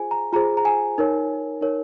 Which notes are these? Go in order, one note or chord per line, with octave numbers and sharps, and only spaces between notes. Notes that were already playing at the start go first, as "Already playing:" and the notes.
Already playing: F4 G#4 C5 G#5
A#5
F4 G#4 C5 A#5
A#5
G#5
D#4 A#4 C#5
D#4 A#4 C#5